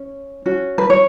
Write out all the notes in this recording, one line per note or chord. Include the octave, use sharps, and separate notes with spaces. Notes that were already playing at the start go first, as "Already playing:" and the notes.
Already playing: C#4
C#4 F#4
B4
C#5